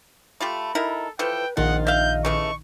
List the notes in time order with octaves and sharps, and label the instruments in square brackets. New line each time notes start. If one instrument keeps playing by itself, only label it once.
[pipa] A3 F4 G4 [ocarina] B5
[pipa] D#3 E4 A#4 [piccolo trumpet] A4
[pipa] E3 F3 A4 [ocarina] B4 [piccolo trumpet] G5
[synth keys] A#1 D#3 D#4 [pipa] F4 [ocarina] D#5 [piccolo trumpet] F#5
[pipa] E5 F5 [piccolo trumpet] G6
[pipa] C#3 E3 A3 [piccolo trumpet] C#6